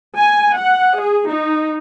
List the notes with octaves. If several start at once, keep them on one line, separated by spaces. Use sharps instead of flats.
G#5
F#5
G#4
D#4